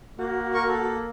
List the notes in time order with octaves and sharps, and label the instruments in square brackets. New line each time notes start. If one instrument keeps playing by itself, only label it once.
[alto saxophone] A#3 [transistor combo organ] F#4
[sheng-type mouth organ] A#4 C#6
A4